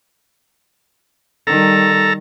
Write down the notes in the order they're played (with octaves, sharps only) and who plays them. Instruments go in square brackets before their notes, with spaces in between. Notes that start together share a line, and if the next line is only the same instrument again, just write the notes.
[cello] D#3 G3 [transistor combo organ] A4 A#5